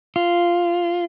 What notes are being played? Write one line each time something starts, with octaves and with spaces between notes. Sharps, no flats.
F4